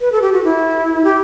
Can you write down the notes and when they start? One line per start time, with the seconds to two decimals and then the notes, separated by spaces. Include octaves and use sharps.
0.01 B4
0.12 A4
0.22 G4
0.33 F#4
0.44 E4
1.04 G4